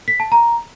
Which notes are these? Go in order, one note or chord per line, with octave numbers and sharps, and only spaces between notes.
B6
A5
A#5